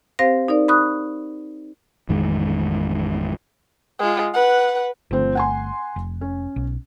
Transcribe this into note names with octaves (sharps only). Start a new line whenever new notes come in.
C4 G4 C5 F5 A#6
D#4 A#4 D5
B5 C#6 D#6 F#6
A1 F2 D#3 G#3
G#3 F4
B4 F#5
G1 D3 F3 A3 C4
F#5 G#5 C6
F1
C#4
B1